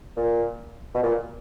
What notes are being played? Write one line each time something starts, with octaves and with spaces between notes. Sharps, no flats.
A#2
B2
A#2